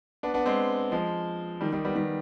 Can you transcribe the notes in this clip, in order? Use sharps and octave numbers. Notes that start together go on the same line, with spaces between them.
B3 D4
B3 D4
G#3 C4
F3 G#3
D#3 G3
D#3 G3
G3 B3
D#3 G3